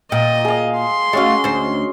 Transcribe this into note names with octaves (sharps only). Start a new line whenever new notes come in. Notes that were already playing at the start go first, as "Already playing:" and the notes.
A#2 D#5 G5
G#4 F5
C6
G#3 A3 C#4 F#4 F5
D2 C5